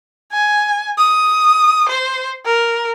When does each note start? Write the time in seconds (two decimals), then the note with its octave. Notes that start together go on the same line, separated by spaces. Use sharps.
0.32 G#5
0.98 D#6
1.89 C5
2.46 A#4